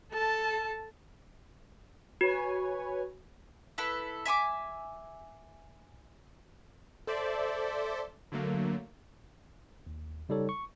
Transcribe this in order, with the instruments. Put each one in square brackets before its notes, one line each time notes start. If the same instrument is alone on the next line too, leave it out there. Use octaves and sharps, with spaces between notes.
[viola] A4 A5
[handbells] F#4 [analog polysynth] B4 C#5 G#5
[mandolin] E4 A4 B4
E5 G#5 C#6 D6
[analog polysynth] A4 C5 D5 E5
D3 F#3 A3 A#3
[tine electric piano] D#2
C#3 G3 D#4 A4 C#5
C#6